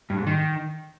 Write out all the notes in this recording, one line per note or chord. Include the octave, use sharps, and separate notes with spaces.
G2
G#2
D#3